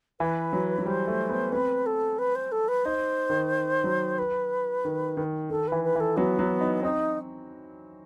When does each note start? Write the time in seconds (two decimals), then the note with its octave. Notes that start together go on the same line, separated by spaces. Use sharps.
0.20 E3 B4
0.53 F#3
0.78 F#3
0.86 G3 C5
1.07 A3
1.30 B3
1.52 C4 B4
1.86 A4
2.18 B4
2.35 C5
2.52 A4
2.68 B4
2.85 D#4 C5
3.30 D#3
3.84 F#3
4.18 B4
4.85 D#3
5.17 D#3
5.50 D#3 A4
5.68 E3 B4
5.84 B4
5.95 E3
6.00 A4
6.17 F#3 B3
6.39 F#3
6.61 D#4
6.83 C4 D#4